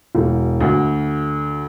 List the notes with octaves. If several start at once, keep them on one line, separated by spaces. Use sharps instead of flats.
E1
D2